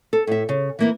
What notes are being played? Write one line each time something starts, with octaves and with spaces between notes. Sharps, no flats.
A4
A2 E5
C#3
E3 A#3 E4